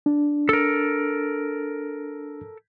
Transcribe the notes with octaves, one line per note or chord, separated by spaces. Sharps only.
D4
A4 A#4